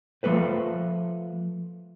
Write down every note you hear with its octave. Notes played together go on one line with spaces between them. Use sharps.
F3 A3 A4 B4 C5